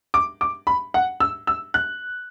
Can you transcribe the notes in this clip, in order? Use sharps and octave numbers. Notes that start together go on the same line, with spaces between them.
D6
D6
B5
F#5
E6
E6
F#6